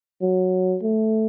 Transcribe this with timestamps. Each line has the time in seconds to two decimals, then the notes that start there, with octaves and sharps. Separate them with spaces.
0.22 F#3
0.82 A3